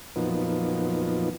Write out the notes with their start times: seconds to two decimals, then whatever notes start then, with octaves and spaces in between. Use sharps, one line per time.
0.16 F2 A#2 F3 F#3 B3 D#4